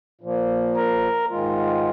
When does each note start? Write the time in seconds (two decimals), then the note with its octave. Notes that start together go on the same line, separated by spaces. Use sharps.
0.21 A#2 F3 A#3
0.76 A#4
1.30 G#2 D#3 G#3 F4